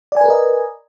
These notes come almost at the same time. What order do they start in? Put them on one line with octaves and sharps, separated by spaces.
D5 G#5 B4 A#4 D#5